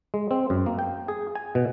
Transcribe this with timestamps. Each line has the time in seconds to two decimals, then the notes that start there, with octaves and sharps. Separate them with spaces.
0.14 G#3
0.31 C4
0.50 F#2
0.66 A#3
0.79 G5
1.08 G#4
1.35 G#5
1.55 B2